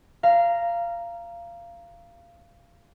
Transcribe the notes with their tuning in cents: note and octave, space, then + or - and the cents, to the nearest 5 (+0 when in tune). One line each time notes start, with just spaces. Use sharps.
F5 -20 A#5 +0